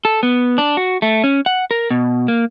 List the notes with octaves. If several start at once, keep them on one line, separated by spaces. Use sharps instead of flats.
A4
B3
D4
F#4
A3
C#4
F#5
A#4
B2
A#3